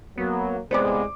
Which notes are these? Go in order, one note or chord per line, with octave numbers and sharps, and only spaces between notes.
F#3 A#3 B3
A2 C3 G#3 B3 C5 D5 D6